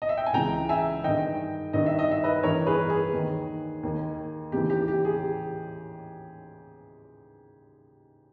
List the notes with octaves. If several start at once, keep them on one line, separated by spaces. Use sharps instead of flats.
D#5
E5
G5
G#5
C#2 C#3 E3 G5 A#5
E5 G#5
G2 D#3 D#5 G5
G2 D#3 D#5
E5
D#5
E5
B4 D#5
G2 E3 A#4 C#5
G#4 B4
G#4
D#2 D#3
D#2 D#3
D#2 C#3 E3 G4
G4
G4
G#4